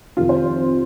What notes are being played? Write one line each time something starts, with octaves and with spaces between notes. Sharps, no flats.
F2 C3 D#3 F4
C5